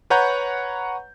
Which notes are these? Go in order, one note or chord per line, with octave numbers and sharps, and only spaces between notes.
B4 C#5 F#5 A#5 G6